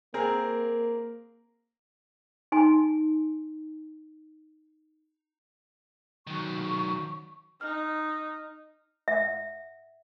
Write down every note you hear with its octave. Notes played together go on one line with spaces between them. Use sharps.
A#3 C4 G#4 A#4
D#4 G#5 C6
D#3 F#3 C#6
D#4 F6
E5 F#5